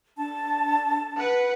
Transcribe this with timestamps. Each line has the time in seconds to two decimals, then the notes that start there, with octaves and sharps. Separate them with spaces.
0.17 D4 A5
1.17 B4 F#5